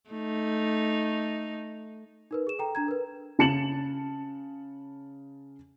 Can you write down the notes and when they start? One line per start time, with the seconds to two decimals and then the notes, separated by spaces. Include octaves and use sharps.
0.10 A3 D#4
2.31 D#4 A#4 B4
2.47 G#4 E7
2.59 A4 G5 A#5
2.75 D4 A#5 G#6
2.88 A#4 B4
3.39 C#3 A5 C#7 E7 F#7